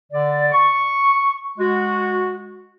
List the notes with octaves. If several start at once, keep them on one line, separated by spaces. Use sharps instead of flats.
D3 D5
C#6
G#3 F#4